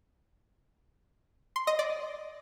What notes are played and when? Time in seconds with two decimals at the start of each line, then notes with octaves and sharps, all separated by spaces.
1.56 C6
1.67 D#5
1.79 D5